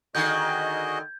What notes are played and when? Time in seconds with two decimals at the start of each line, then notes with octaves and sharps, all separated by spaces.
0.15 D3 D#3 F#4 G#4 D#5 G6 G#6